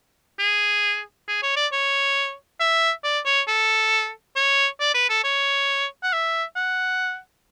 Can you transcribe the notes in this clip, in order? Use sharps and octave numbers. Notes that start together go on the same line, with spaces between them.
G#4
G#4
C#5
D5
C#5
E5
D5
C#5
A4
C#5
D5
B4
A4
C#5
F#5
E5
F#5